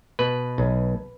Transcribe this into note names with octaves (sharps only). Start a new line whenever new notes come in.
B2 B4
B1